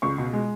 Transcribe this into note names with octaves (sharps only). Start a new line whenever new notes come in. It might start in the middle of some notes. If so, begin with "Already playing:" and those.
C#2 C#6
B2
G#3